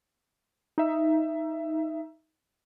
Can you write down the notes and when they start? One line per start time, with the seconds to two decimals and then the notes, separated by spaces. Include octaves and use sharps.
0.78 D#4 E5